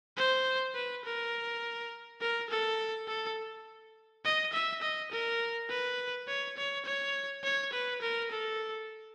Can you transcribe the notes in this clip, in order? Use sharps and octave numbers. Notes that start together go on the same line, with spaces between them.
C5
B4
A#4
A#4
A4
A4
D#5
E5
D#5
A#4
B4
C#5
C#5
C#5
C#5
B4
A#4
A4